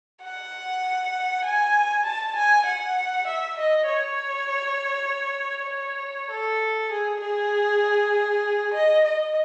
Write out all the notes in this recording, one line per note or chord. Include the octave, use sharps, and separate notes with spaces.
F#5
G#5
A5
G#5
F#5
E5
D#5
C#5
C#5
A4
G#4
G#4
D#5
D#5